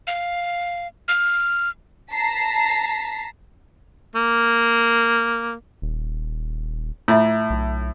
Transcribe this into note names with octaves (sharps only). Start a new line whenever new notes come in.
F5
F6
A5 A#5 B6 C7
A#3
D#1
A2 F4 E5
B1